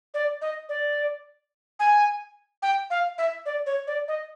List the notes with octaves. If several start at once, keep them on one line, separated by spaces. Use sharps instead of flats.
D5
D#5
D5
G#5
G5
F5
E5
D5
C#5
D5
D#5